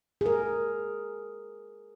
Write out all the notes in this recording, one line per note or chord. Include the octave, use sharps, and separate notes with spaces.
G#4
A#4